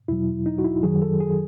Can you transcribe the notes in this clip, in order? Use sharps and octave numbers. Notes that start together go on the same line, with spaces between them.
E2 B2 F#3 E4
D#4
F#4
E4
F#2 D#3 F#3 G#4
A4
G#4